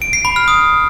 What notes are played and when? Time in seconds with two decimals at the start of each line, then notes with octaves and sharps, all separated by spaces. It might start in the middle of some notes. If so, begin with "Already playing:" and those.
0.02 D7
0.13 C7
0.25 B5
0.36 F6
0.48 D#6